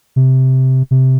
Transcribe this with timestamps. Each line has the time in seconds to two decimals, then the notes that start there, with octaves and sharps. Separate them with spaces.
0.16 C3
0.91 C3